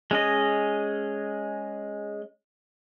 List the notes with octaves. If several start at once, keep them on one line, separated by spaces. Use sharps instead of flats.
G#3 C#4 D#5